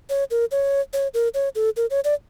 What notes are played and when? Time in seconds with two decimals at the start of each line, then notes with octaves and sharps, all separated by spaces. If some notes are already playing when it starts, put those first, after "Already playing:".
0.10 C#5
0.31 A#4
0.51 C#5
0.93 C#5
1.14 A#4
1.34 C#5
1.55 A4
1.77 A#4
1.90 C#5
2.04 D5